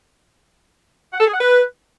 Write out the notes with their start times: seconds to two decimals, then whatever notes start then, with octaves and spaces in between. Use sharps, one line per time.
1.14 F#5
1.20 A4
1.27 G#4
1.34 F#5
1.41 B4